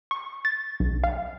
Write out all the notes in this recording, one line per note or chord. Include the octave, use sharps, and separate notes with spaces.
C#6
A6
B1
F5